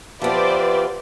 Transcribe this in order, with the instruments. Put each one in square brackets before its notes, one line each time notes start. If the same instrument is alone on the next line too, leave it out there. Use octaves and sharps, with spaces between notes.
[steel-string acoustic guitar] F3 B3 [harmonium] G4 E5 F5 [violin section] B4 C5 D5